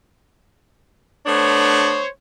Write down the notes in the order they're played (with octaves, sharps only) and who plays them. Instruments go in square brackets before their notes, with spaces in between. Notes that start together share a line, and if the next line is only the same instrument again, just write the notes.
[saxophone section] A3 B3 D4 [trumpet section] C5 C#5